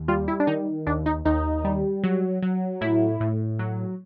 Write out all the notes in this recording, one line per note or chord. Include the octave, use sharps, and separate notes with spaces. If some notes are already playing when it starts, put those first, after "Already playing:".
Already playing: D#2
G3 F4
E4
D4
D#3 D#4
D#2 D4
D#4
D#2 D#4
G3
F#3
F#3
A2 E4
A2
F#3